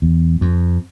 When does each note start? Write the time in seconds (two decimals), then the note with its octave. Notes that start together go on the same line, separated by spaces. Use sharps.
0.02 E2
0.41 F2